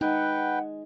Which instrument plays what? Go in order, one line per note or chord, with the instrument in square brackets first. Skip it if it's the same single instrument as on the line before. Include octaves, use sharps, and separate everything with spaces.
[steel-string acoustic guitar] G#3 [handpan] D#4 [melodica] B4 G5 [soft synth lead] F#5